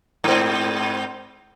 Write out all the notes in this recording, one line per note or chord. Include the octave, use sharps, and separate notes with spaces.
G#2 C4